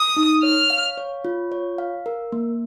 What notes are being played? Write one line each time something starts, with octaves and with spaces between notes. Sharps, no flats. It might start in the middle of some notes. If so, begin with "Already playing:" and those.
Already playing: D#6
D#4
C#5 F6
F5
C#5
F4
C#5
F5
A#4
A#3